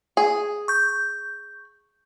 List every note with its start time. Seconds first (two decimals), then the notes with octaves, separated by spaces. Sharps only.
0.17 G#4
0.68 C#6 G6